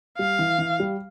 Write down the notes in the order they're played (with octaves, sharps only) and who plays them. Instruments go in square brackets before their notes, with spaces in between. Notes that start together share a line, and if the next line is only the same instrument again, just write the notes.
[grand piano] G3 [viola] F5
[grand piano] E3
E3
G3